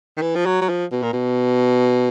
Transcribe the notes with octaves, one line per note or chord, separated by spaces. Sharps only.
D#3
E3
F3
F#3
F#3
F3
B2
A#2
B2